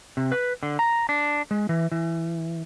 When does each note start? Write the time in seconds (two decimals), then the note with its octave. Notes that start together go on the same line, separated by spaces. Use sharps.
0.17 C3
0.32 B4
0.63 D3
0.79 A#5
1.09 D4
1.51 G#3
1.69 E3
1.92 E3